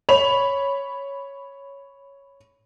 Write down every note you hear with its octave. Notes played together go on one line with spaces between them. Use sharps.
C#5 B5 F7